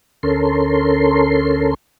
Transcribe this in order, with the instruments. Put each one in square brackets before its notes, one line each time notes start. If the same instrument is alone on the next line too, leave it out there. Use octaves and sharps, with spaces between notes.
[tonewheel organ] D2 C#4 A4 A#4 C6